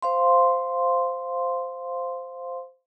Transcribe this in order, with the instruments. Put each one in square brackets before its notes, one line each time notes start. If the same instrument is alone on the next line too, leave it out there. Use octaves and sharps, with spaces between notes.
[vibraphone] C5 F5 C6